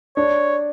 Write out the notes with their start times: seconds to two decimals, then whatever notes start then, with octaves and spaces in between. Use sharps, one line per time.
0.16 D4 C#5